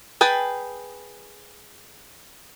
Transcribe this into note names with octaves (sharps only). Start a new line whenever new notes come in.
G#4 B4 G5 A5